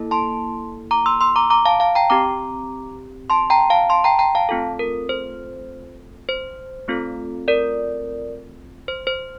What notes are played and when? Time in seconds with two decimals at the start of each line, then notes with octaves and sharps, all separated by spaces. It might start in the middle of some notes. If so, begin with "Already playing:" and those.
Already playing: A#3 E4 A4
0.11 A5 C6
0.91 A#5 D6
1.06 C6 E6
1.21 C6 E6
1.36 A#5 D6
1.50 A#5 D6
1.65 F5 A5
1.80 F5 A5
1.95 G5 A#5
2.10 C4 G4 A#5 D6
3.30 A5 C6
3.50 G5 A#5
3.70 F5 A5
3.90 A5 C6
4.04 G5 A#5
4.19 G5 A#5
4.35 F5 A5
4.49 A3 C4 F4 A4
4.79 A#4
5.09 C5
6.29 C5
6.88 A3 C4 F4 A4
7.48 A#4 D5
8.88 C5
9.07 C5